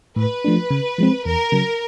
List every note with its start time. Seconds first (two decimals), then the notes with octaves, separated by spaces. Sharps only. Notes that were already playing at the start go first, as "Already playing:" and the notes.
0.16 A2 B4
0.44 F3 A3 D4
0.70 C#3
0.98 F3 G#3 C4
1.25 E2 A#4
1.52 C#3 F#3